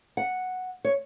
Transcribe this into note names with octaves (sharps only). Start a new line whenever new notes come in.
F#5
C#5